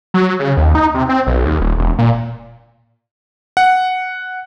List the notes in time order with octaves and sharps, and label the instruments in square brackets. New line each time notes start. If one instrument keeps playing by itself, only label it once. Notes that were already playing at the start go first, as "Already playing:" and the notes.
[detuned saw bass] F#3
C#3
D#2
D#4
C3
C4
B1
D#2
D#1
E1
A#2
[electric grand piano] F#5